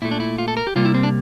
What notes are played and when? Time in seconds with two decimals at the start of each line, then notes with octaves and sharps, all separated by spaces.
0.02 A#2 A3 E4
0.11 D4
0.20 E4
0.38 F4
0.48 A4
0.57 A#4
0.67 G4
0.75 C3 G3 A#3 F4
0.85 E4
0.94 C4
1.03 D4